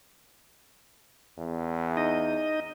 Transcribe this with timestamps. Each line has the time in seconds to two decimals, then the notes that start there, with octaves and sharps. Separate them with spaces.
1.38 E2
1.97 D#4 D#5